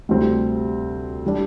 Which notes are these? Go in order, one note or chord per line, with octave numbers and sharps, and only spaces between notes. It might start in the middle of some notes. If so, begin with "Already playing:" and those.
D2 C3 G3 C4
G3 D4